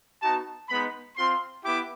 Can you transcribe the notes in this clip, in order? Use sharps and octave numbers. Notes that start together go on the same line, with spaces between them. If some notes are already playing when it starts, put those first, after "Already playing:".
B3 D#4 F#4 A5
G#3 B3 D#4 B5
C4 F4 C6
B3 E4 G4 D6